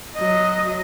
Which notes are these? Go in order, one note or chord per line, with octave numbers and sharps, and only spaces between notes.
F#3 D#5